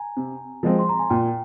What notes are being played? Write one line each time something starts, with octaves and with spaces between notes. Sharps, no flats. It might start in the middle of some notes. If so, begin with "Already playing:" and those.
Already playing: G#5 A#5
C3
F3 G#3 C4
C6
A#5
G#5
A#2 G5